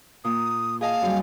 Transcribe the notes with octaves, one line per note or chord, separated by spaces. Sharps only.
A#2 D#6
G#4 D#5 F5 A5
F#2 G3